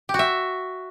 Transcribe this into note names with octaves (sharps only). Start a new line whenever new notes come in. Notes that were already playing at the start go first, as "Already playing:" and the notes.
G4
F#4
E5